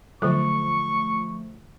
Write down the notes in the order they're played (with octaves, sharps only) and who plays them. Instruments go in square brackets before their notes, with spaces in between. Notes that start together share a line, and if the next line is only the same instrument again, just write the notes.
[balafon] D3 F#3 A4 [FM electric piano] F3 A3 [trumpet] C#6